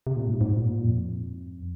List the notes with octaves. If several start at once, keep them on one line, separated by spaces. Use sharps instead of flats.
C3
A#2
G#2
G#2
A#2
F2